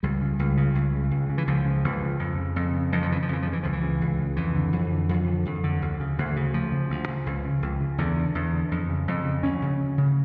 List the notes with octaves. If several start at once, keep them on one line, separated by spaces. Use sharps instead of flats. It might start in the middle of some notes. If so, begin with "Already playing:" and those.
C#2 G3
C#3
C#2
C#3
C#2
C#3
C#2
C#3
E3
C#2 F3
C#3
C#2
C#3
F2
C#3
F2
C#3
F2 E3
F3
C#3 E3
F3
F2 E3
C#3 F3
E3
C#2 F3
E3
C#3
C#2
C#3
F2 E3
D3
F2
D3
F2
D3
F2
D3
D2
C#3
D2
C#3
D2 F3
C#3
D2
C#3
C#2
C#3
C#2
C#3
E2 D3
D3
E2
D3
F2
C#3
F2
C#3
D2 C#4
C#3
D2
C#3